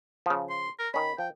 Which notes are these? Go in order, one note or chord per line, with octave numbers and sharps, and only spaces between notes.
C#3 F3
C6
A#4
D#3 C#4 B5
F3 G5